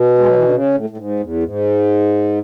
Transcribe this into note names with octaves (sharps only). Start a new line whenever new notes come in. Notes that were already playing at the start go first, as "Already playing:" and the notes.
Already playing: B2
G#3
F#3
E3
D3
C#3
A2
A2
G#2
E2
G#2